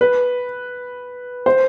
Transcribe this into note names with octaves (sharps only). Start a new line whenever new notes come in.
B4
C5